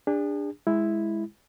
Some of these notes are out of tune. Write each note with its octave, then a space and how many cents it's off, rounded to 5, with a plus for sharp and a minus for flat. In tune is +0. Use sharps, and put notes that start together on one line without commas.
D4 +0 G#4 -40
G#3 +0 E4 +0